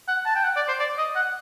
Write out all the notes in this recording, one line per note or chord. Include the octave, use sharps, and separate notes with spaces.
F#5
A5
G5
F#5
D5
C5
D5
D#5
F#5